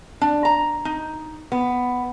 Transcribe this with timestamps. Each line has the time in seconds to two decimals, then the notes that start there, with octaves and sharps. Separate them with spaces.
0.21 D4
0.45 A#5
0.85 D#4
1.52 B3